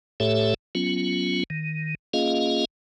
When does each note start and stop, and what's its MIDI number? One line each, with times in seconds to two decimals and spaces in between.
0.20 0.54 45
0.20 0.54 57
0.20 0.54 67
0.20 0.54 69
0.20 0.54 73
0.20 0.54 76
0.75 1.44 54
0.75 1.44 59
0.75 1.44 61
0.75 1.44 65
1.50 1.95 51
2.14 2.65 58
2.14 2.65 61
2.14 2.65 65
2.14 2.65 68
2.14 2.65 75
2.14 2.65 77